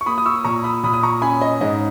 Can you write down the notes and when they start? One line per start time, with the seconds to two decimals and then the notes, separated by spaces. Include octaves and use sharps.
0.01 C#6
0.06 A#3 B5 D#6
0.18 D#6
0.26 C#6 E6
0.45 A#2 A#5 C#6
0.64 B5 D#6
0.83 A#2 B5 D#6
0.93 D#6
1.03 A#5 C#6
1.22 C#4 G#5 B5
1.42 D#5
1.61 G#2 D#5